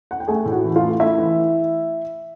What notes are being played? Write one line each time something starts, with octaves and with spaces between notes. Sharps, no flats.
F#5
G5
A3 G#4 G#5
A2
F#4 F#5
E3
F4 F5
A3
A3 E4 E5
E3